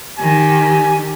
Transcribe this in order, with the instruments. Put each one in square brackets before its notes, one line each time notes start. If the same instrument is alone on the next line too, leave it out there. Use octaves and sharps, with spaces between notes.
[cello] D#3 G4 [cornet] G#5